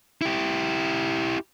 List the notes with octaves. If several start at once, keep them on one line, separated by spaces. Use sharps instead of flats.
E4 G4